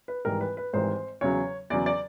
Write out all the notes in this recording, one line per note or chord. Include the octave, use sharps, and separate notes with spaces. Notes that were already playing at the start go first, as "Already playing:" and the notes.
B4
G#1 G#2 E3 G3 A#4
B4
B4
G#1 G#2 E3 G3 C5
E2 C#3 F#3 C#5
E2 C#3 F#3 D5
D5